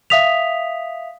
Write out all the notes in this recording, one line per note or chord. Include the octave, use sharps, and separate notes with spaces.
E5 F5 D#6 B6 F7